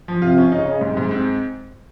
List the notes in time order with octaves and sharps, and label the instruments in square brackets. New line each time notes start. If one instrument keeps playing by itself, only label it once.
[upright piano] F3
[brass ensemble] C3 [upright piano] F4
[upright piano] C#4
[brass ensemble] C#3 [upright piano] D#4
[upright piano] D#4
[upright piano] G#2 [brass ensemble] C3
[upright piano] G#2
C4